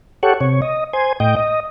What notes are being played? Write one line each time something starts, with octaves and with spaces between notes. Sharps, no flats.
G4 A4 C#5 F#5
C3 C#5
D#5
C5 G#5
A2 D#5 G5
D#5